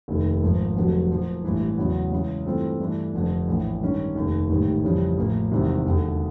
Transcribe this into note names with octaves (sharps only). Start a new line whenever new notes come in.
F1 D#2 D#3
G#1 G#2 F3 A#3
F1 F2 D3 F#3
A#2 F3 A#3
A1 G2 E3 G#3
E2 C#3 F#3 B3
C#2 C#3 E3 G#3
G2 E3 A3 C4 F4
G2 E3 A3 D4
F1 F2 D3
A#1 A2 E3
G2 D#3 G#3 C#4
F1 D#2 D#3
A1 G#2 D#3 G3
F2 C#3 E3 G3
A1 A2 F3 A#3
E1 E2 C3 D#3 G3
E1 D#2 D3